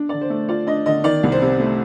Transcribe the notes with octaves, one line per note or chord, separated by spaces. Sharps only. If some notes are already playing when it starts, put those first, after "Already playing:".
Already playing: D4
D3 D5
C5
A3
F4 D5
D4 D#5
D3 D#5
D#3 D5
C2
C5
C3
A3